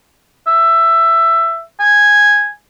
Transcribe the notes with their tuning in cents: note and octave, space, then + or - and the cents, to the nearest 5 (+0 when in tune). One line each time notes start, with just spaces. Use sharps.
E5 +15
G#5 -5